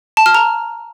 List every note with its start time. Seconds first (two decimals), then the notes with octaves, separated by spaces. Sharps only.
0.17 A5
0.26 F6
0.35 A#5